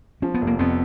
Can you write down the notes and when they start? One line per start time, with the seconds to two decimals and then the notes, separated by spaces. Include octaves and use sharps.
0.22 F3 C#4
0.34 B3
0.41 F1
0.47 A#3
0.59 F2 B3